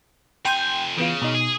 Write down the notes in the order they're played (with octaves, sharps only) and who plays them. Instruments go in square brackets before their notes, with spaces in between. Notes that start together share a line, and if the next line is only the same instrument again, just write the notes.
[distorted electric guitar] F2 G#5 [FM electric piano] G5 C6 G6
[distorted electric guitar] C#3 [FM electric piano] E3 B3 F4
[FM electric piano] B2 D#4
[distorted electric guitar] G#4